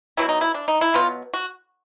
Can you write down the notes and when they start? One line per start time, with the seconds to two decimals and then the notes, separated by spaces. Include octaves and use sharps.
0.17 B2 F#3 B3 E4
0.29 D#4
0.41 E4
0.54 D4
0.68 D#4
0.81 E4
0.94 B2 F#3 B3 F4
1.34 F#4